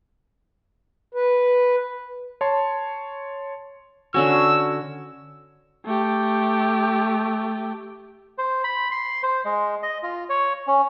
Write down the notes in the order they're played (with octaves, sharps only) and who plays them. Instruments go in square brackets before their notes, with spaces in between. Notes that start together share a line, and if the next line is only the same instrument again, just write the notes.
[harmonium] B4
[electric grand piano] C#5 A5 C6
[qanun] D3 C#4 G#5 [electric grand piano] F#4 [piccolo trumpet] E6
[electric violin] A3 G4
[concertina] C5
B5
C6
C5
G#3
D#5
F4
C#5
C#4